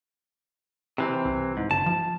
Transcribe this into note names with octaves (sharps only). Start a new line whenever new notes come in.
C3 E3 C4
C2
G#2
G1 A5
F3